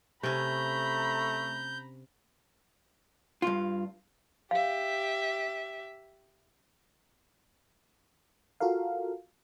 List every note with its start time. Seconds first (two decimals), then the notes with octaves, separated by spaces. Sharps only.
0.23 C3 A3 C#4 A#5 B5 G6
3.42 G2 F4
4.51 G4 E5 F5
8.60 F4 F#4 A4 A#4 F5